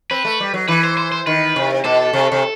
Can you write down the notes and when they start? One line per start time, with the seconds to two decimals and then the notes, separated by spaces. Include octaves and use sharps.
0.11 C4 B4
0.25 A3
0.40 G3
0.54 F#3
0.68 E3 B4
0.84 C5
0.97 C5
1.12 C5
1.27 D#3 B4
1.56 C3
1.84 B2 A4
2.13 C3
2.32 C3